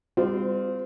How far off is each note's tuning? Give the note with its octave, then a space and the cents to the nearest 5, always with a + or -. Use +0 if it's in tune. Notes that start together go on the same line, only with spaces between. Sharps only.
G3 +35 C4 -30 F4 +0